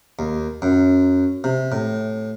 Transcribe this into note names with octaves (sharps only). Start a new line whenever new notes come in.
D#2
F#2
C3
A2